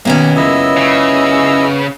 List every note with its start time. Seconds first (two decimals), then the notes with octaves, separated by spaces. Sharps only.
0.05 B1 D#3 A#3 B3 C#4
0.36 C#2 F#2 E4 D#5 E6
0.77 C#3